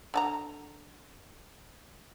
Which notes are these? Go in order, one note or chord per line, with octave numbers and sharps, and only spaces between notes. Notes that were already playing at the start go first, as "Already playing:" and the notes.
D3 A5 A#5